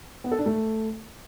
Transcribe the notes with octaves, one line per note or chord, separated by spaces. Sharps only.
B3
A4
D4
A3